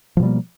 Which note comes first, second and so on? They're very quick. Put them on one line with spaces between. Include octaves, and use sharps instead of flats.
F3 B2 G3 A#3